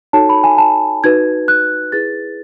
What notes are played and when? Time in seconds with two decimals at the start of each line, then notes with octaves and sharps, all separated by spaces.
0.13 D#4 F#4 A4 C#5 A5
0.29 B5
0.44 G#5
0.58 A5
1.04 D#4 F#4 B4 G#6
1.48 F#6
1.92 E4 G#4 B4 A6